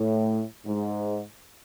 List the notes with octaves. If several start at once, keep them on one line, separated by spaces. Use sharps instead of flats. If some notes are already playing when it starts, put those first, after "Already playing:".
Already playing: A2
G#2